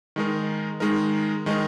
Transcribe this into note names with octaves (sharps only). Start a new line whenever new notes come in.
D#3 G#3 D#4 A#4
D#3 G#3 D#4 A#4
D#3 G#3 D#4 A#4